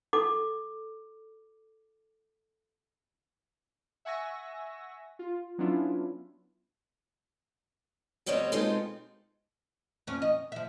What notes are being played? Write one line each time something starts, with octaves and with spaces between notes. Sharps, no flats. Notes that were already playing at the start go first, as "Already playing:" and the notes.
A4 D6
E5 F#5 G#5 C#6 E6 A#6
F4
F#3 B3 C#4 D4 E4 F4
D2 G3 B3 C4 C#5 D#5
B2 G#3 C4 D#4 F4 A4
F2 C#4
D#5
F3 E5